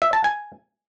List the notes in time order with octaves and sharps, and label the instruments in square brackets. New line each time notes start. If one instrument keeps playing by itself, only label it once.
[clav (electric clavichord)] E5
A5
G#5